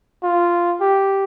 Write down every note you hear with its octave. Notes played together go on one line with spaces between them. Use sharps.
F4
G4